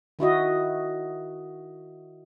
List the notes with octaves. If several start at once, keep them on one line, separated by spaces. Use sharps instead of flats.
D#3 E4 F#4 D#5